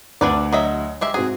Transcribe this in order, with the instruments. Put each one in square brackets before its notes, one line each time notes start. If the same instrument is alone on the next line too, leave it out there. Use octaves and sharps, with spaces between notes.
[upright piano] D2 F#5 [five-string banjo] D4 B4 D5
[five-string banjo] F#3 D#5 E5
G#3 G4 E5
[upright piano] G#2 C4 F#4 [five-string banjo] G#4